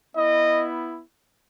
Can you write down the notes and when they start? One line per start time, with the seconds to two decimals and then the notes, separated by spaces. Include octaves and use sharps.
0.15 B3 E4 D#5